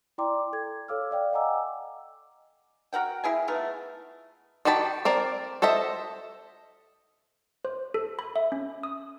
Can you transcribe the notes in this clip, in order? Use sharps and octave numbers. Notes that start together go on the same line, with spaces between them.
E4 D5 G5 A#5 C6 D6
A4 G#6
A4 C#5 F5 D6 E6 F6
D5 F5 G5
D#5 F#5 G#5 A#5 D6 E6
F#4 A#4 F#5 G5
A#3 E4 G#4 G#5
A3 B3 D#4 F4
D#3 F#4 G4 A5 B5
C4 A#4 D5
A4 C5 D#5 E5
C5
A4
B5
E5
C#4
D#6